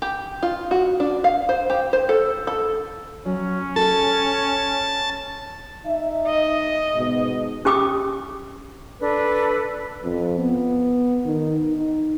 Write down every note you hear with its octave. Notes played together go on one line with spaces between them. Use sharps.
G4
F4
F#4
D4
F5
C5
G4
C5
A4
A4
F#3 C#4
A4 A5
D#4 E5
D#5
G#2 B2
C#4 G4 G5 D6 D#6
D4 A4 B4
F2
B3
D#3
D#4